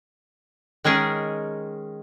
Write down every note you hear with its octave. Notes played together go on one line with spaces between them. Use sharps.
D#3 G#3 C#4 G#4 A#4